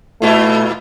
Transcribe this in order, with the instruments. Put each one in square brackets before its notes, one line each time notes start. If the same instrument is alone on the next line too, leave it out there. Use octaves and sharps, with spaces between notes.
[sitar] A#2 E4 F4 [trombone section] A3